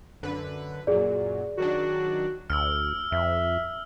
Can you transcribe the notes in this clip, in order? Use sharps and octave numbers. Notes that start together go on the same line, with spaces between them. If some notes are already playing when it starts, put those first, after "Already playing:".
F#2 D3 B4
F#2 A#2 F#3 G#4 D5
D#3 F#3 D4 F#4
D2 E6 F6
F2 E5